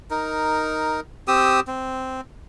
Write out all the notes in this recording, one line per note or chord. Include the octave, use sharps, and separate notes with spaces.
D#4 A#4
C4 G4 D#6 E6
C4